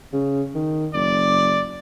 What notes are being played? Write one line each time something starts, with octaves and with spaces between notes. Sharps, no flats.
C#3
D#3
F#1 D5